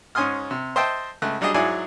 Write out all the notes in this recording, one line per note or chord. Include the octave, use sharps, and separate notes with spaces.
G#2 C#4 G#5 C6 D#6 F6
C3
C5 D#5 E5 G5 A5
C#2 A3 F#6
F#3 G3 D4 G#4 D#5
G#2 F#3 E4 G#4 D5 G#5